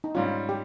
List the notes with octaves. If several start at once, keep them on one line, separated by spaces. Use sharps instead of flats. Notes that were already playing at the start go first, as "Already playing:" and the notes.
D#4
G#2 G3 C#4 F4
G4